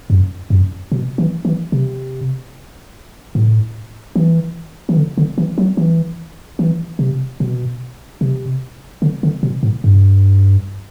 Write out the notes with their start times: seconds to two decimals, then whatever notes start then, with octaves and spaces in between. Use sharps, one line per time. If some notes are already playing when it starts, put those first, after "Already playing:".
0.10 F#2
0.50 F#2
0.92 B2
1.18 E3
1.45 E3
1.72 C3
3.35 A2
4.16 E3
4.89 E3
4.97 D3
5.18 D3
5.38 E3
5.58 F#3
5.77 E3
6.59 E3
6.99 C3
7.40 B2
8.21 C3
9.02 D3
9.23 D3
9.43 B2
9.63 A2
9.84 G2